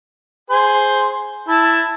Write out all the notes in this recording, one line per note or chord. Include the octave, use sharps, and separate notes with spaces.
G#4 C5
E4 A5